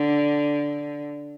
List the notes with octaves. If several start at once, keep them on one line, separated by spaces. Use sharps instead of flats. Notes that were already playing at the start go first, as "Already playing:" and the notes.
Already playing: D3